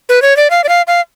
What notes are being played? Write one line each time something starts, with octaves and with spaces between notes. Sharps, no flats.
B4
C#5
D5
F5
D5
F5
F5